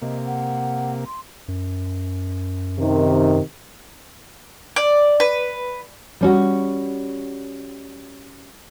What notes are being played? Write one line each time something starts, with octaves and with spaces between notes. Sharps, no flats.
C3 A#3 D#5
F#5
C6
F#2
C3 D#3
D5
B4
G3 C#4 F#4